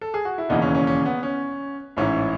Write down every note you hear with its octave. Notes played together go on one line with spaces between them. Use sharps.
A4
G#4
F#4
E4
E1 D#2 C#3 E3 B3 D#4
C#4
C#4
C#4
B3
C#4
A1 G#2 E3 C#4 E4